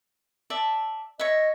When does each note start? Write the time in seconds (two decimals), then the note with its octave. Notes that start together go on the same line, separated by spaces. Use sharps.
0.50 D5 E5 A5
1.19 C#5 D#5 E5